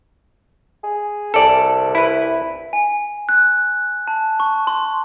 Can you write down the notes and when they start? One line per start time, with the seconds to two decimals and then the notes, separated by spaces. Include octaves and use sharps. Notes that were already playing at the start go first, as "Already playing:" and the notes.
0.83 G#4
1.34 C2 A4 D5
1.95 E4 B4
2.73 G#5
3.29 F#6
4.08 A5
4.40 C#6
4.67 C6